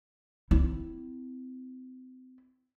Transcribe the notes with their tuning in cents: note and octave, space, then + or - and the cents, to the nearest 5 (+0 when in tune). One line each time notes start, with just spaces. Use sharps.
C4 -35 E4 +0